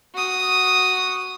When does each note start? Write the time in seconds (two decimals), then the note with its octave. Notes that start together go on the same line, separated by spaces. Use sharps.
0.14 F#4 D#6